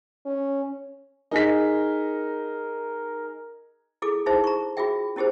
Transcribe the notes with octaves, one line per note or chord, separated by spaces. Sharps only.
C#4
D#4 G#4 A#4 B6
E4 G#4 A4 D6
D#4 E4 G#4 C5 E5
A#5 C#6
F4 F#4 G#4 E5 G5
C#4 E4 G4 G#4 C5